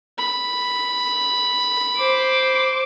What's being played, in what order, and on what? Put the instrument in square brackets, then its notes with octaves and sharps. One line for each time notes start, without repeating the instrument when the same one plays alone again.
[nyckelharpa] B5
[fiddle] C5 D6